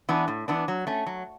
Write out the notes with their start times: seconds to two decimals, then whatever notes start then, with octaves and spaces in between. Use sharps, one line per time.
0.09 E3 B3 D4
0.28 A2
0.48 E3 B3 D4
0.68 F#3
0.87 A3 C#4
1.06 F#3